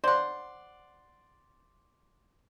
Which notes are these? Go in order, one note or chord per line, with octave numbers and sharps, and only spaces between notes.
C5 D5 F#5 C6